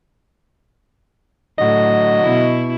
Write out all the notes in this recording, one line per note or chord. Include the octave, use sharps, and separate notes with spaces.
A2 D3 F#3 D#5
B2 E4